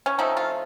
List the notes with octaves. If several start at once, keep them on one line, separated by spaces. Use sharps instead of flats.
C#4
F3 A3 C4 D#4
F4